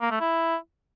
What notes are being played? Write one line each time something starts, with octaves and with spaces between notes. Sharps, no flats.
A#3
A3
E4